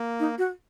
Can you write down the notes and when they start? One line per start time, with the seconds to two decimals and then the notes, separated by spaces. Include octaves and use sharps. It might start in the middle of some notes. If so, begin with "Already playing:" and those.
Already playing: A#3
0.20 D#4
0.38 F#4